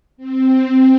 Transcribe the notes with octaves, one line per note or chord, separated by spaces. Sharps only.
C4